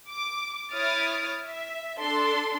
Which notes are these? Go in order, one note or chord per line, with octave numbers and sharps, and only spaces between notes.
D6
E4 C#5 D#6 F6 A6 D7
E5
D4 A4 C6